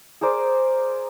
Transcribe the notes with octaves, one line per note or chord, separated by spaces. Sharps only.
G#4 A#4 C5 D5